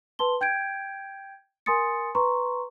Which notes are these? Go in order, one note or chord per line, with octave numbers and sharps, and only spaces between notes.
B4 A5 C6 G7
G5 G6 G#6 D7
A#4 G#5 C6 D#6 A6 C#7
B4 A#5 C6 C#6